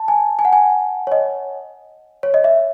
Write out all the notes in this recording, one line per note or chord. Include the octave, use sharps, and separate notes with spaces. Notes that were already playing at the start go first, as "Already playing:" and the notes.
Already playing: A5
G#5
G#5
F#5
G#5
C#5
D#5
C#5
D#5
E5